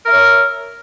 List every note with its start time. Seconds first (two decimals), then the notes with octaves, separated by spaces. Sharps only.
0.03 A#4
0.07 E5
0.12 C#5